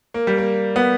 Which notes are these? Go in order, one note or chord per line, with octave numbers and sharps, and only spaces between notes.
A#3
G3
A#3
B3